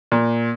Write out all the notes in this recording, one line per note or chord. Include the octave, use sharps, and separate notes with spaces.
A#2